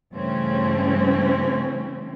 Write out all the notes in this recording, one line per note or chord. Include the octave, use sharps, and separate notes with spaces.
G2 C#3 E3 A3 C4 C#4